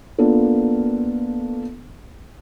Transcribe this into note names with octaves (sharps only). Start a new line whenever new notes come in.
A#3 B3 D4 F4 A4